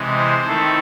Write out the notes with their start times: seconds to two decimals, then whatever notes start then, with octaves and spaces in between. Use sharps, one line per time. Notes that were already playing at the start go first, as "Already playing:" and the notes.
Already playing: C3 E3 G#3
0.17 C5
0.46 D#3 A3 C4 E4 A4